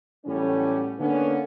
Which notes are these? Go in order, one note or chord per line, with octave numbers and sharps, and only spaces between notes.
A2 E3 F#3 G3 B3 C#4
D3 A#3 B3 C#4